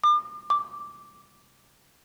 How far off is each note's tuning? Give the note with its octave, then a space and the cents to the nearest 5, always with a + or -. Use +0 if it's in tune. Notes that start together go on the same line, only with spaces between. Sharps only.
D6 +35
D6 -5